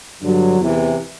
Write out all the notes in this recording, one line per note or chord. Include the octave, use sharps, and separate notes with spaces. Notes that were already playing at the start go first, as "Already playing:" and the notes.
G2 D3 F#3
E2 C3 E3